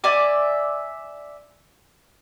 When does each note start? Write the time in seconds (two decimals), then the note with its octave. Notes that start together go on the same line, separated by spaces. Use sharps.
0.04 D5 E5 G#5 D6